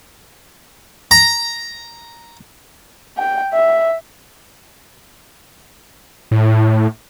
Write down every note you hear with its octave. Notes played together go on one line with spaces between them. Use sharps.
A#5
G5
E5
A2